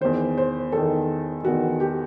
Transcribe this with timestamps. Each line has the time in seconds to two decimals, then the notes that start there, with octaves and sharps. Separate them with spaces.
0.01 E2 D#3 C5
0.38 C5
0.72 E2 D#3 A4
1.44 E2 D#3 F#4
1.80 G4